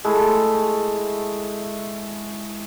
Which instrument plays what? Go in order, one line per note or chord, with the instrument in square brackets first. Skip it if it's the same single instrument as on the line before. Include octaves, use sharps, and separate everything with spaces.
[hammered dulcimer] G#3 A3 E4 A4